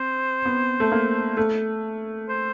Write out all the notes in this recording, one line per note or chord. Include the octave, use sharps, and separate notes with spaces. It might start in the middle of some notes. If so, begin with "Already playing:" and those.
Already playing: C4 C5
B3
A3
A#3
A3
C5